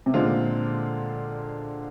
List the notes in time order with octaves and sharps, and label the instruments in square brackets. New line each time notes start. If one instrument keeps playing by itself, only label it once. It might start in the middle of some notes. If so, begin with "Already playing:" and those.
[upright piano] C3
[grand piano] A#2 G#3 C4 F4 [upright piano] D3